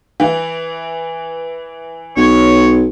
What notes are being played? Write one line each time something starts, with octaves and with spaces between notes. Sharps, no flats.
E3
B1 C#5